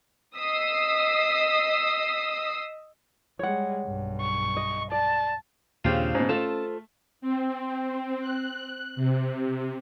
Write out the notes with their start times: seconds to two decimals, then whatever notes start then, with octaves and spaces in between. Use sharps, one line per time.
0.37 D#5 D#6 E6 B6 C7
3.39 G3 G#3 C#5 F#5
3.86 B1 G2
4.21 C#6
4.57 D#5
4.92 D5 A5
5.85 D#2 A#2 C#3 C4 D4 F4 G4
6.15 G#2 B2 C#4
6.29 A3 F4 A4 C5 A5
7.21 C4
8.20 F#6
8.96 C3